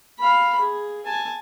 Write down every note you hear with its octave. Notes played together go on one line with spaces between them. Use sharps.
F5 B5
G#4
G#5 A5